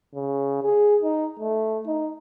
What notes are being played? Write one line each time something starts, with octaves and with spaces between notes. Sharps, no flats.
C#3
G#4
D#4
A3
D#4